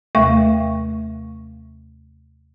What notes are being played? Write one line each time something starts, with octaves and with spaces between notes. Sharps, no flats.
D#2 C3 A3 E5 F5 C#6